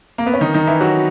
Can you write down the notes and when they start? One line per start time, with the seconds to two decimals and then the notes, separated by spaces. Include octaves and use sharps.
0.18 A#3
0.26 B3
0.34 C#4
0.41 D#3 D#4
0.54 D#3 D#4
0.67 E3 E4
0.80 F#3 F#4